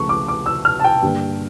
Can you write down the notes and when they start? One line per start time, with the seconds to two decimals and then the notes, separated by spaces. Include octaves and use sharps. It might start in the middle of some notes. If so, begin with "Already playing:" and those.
Already playing: C#2 C#3 F3 A3 C#6
0.09 D6
0.28 D6
0.46 E6
0.65 F6
0.80 A5
0.84 G5
1.02 G2 D3 G3 A#3